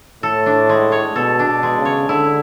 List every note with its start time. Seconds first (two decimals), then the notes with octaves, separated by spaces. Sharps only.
0.23 A2 A4
0.46 D4
0.69 G#3
0.92 C#5
1.16 B2 A4
1.39 D4
1.47 B2
1.63 G#3
1.78 C#3
1.85 C#5
2.09 D3 E4